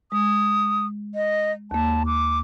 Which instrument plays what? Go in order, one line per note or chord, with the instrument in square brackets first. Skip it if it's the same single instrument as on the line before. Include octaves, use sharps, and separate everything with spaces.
[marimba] G#3 [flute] D#6
[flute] D#5
[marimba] D#2 A#3 [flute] A5
[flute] D6